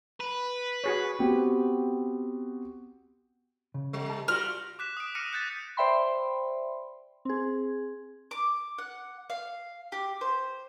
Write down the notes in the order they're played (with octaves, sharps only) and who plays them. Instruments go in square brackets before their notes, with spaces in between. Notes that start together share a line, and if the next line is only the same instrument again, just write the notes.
[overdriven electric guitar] B4
[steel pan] F#4 G#4 C#5
[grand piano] B3 C4 F#4 G4
[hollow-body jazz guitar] C#3
[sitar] G3
[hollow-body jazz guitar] A5
[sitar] G3 F4 F#4 [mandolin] F6
[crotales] D6 F#6 B6 E7
D#6 D7
D6 D#6 F6 A#6 C#7 D#7
F#6 G6 A6 B6
[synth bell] C5 D5 E5 G5 B5 C6
C4 G#4
[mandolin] D6
F#5
F5
G4
C5